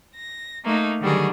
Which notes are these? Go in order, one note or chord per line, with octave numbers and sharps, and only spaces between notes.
A#6
A3 A#3 D#4
D3 D#3 F#3 G3 F#4 G#4